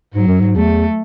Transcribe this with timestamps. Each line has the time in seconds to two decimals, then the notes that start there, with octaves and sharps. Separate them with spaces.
0.14 G#2 F#3
0.27 F#2
0.40 G#2
0.56 E2 A3